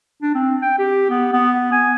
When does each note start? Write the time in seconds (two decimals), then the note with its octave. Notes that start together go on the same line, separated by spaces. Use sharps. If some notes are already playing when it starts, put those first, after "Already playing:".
0.22 D4
0.35 C4
0.62 G5
0.79 G4
1.10 B3
1.33 B3
1.72 G#5